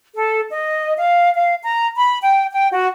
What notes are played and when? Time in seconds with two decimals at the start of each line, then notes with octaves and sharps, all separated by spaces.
0.14 A4
0.50 D#5
0.97 F5
1.33 F5
1.62 A#5
1.96 B5
2.21 G5
2.52 G5
2.71 F#4